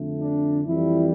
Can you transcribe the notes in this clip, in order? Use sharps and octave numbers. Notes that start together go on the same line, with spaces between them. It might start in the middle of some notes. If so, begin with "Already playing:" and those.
Already playing: F2 D3 A3
D4
F2 E3 G3 E4